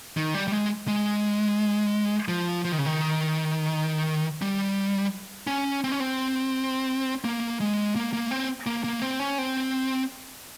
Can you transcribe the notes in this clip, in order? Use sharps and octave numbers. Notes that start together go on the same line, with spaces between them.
D#3
G3
G3
G#3
G#3
F3
F3
D#3
C#3
D#3
G3
C#4
C4
C#4
C4
A#3
G#3
A#3
A#3
C4
A#3
A#3
C4
C#4
C4